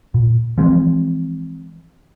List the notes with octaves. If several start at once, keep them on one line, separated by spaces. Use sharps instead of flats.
A#2
E3 F3 G#3 C4